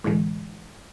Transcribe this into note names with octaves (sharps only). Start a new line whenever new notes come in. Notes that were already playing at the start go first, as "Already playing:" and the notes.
A2 D3 E3 G#3 A3